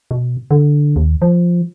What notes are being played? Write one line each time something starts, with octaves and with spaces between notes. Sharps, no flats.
B2
D3
D#2
F3